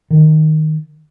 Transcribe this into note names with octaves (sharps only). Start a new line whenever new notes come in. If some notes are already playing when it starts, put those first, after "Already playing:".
D#3